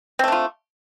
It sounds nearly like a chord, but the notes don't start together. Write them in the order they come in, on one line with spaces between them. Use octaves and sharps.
C4 A3 D4 F4